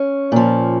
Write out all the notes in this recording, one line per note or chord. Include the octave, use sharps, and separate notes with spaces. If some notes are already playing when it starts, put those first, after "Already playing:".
Already playing: C#4
A#2 F3